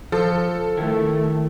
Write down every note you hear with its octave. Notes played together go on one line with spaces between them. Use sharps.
F3 A4
D#3 A3 E4 A#4